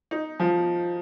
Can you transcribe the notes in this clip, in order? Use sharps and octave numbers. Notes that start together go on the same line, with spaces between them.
D#4
F3